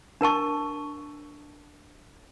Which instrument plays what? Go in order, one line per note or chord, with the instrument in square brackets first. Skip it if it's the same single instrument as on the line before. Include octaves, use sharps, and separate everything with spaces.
[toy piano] D4 A#4 A5 C#6